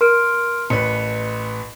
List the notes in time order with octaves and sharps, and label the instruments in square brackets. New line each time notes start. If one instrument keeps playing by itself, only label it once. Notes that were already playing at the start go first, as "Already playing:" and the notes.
[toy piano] A#4 [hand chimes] C6 F6 D7
[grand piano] A1 B4 [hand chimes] C#7